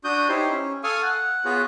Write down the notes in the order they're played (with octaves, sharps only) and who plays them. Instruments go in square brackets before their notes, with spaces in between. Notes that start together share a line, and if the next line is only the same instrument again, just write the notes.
[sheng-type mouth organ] D4 F#4 D#6 G6
D#4 E4 G4 C5 C#5
C#4
A4 F5 G#5 C#6 D#6 F6
F#5
B3 F4 F#4 G#4 B4 C#5